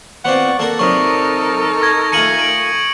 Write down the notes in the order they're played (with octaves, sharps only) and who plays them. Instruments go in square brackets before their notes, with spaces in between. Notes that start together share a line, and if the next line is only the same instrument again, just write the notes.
[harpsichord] B3 C4 F4 [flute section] D5 C#6 D6 [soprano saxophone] F#5
[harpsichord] A#3 F#4 A#4 [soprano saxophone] A4
[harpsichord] C3 F#3 D4 [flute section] D#4 A#4 [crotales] C#6 D#6
[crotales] C#6 G#6 A#6
[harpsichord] A3 F4 G#5 [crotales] C#7 D#7 F#7
[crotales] D7 D#7